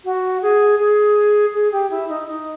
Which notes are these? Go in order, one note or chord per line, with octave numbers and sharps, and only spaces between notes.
F#4
G#4
G#4
G#4
G4
E4
D#4
D#4